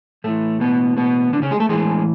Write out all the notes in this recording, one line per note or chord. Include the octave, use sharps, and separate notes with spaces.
A2 E3 A3
B2 B3
B2 B3
D3 D4
C#3 C#4
G#3 G#4
A3 A4
A2 E3 G#3 G#4